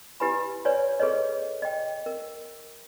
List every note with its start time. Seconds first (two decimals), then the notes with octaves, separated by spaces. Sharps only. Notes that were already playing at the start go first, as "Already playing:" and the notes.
0.20 E4 G4 B4 G#5 B5
0.65 B4 C#5 D5 G#5
1.00 G#4 A4 B4 C#5 D#5
1.62 D#5 G5
2.06 A#4